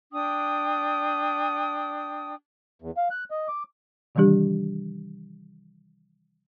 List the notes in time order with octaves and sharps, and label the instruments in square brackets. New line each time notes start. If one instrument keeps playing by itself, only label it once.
[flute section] D4 G5 D#6
[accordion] E2
F5
F#6
D#5
D6
[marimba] C3 D#3 E3 G3 D4 G4